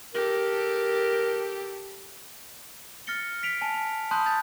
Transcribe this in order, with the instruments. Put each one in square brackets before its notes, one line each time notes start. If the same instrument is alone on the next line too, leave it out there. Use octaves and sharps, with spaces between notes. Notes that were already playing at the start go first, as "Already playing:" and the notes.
[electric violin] G4 A4 [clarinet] A#4
[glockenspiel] F6 A6 A#6 C#7 G7
B6 D7 F7
G#5 A5
F7
A5 B5 C6 D#6 F#6 G6
D#6 G6 A6 F7